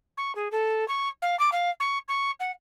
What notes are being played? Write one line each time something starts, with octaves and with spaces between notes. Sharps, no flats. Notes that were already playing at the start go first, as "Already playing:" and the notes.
C#6
G#4
A4
C#6
F5
D6
F5
C#6
C#6
F#5